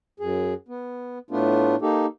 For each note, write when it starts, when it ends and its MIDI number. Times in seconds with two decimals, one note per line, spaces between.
0.20 0.54 42
0.20 0.54 68
0.68 1.18 59
1.31 1.75 45
1.31 1.75 57
1.31 1.75 59
1.31 1.75 62
1.31 1.75 65
1.82 2.06 58
1.82 2.06 63
1.82 2.06 67
1.82 2.06 69